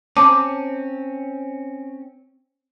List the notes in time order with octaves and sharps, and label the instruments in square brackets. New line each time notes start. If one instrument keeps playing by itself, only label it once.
[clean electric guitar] C4 C#4 [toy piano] A5 A#5 [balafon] D6